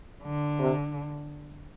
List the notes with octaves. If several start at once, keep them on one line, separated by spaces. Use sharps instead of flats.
D3
C3